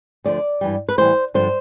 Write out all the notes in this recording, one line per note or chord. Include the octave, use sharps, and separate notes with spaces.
D2 D3 F3 D5
G2 E3 G3
B4
A2 E3 G3 C5
G2 D3 F3 C5